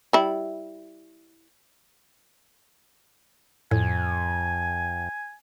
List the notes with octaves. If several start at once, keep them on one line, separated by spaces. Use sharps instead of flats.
G3 E4
F2 A2 G#5